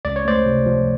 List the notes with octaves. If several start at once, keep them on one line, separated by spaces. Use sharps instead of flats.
C#2 D5
C#5
A3 C5 D5
C3
F3